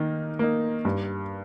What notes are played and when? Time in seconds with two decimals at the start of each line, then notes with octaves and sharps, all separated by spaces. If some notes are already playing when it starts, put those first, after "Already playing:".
Already playing: D#3 A#3 D#4
0.39 A#3 D#4
0.85 G2